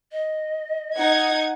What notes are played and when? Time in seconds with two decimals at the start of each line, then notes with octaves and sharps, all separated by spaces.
0.12 D#5
0.96 D#4 F#5 G#6